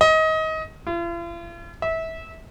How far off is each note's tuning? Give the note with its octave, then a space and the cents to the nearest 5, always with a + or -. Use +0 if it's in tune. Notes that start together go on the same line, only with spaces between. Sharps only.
D#5 +25
F4 -45
E5 -25